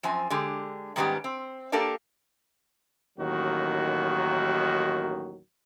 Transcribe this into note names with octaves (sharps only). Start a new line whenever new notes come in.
F#2 F3 C4 G#5
D3 G#3 G4
G#2 D#3 G3 B3 C#4 G4
C4
A#3 D4 G4 A4 A#4 D5
A1 D#2 D#3 F#3 F#4